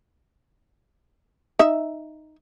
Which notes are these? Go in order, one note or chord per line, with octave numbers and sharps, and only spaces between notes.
D#4 E5